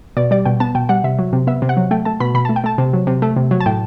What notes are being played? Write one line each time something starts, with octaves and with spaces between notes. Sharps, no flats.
B2 D5
G3 D5
B2 G5
B3 A5
B2 G5
G3 F#5
C3 E5
F#3
C3
B3 E5
C3
F#5
F#3
A3 G5
A3 A5
B2 B5
B2 B5
A3 A5
G5
A3 A5
C3
F#3
C3
A3
C3
F#3
A5
A2 G5